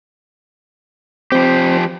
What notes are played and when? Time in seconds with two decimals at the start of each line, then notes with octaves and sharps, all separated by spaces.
1.32 F3 C4 G4 C5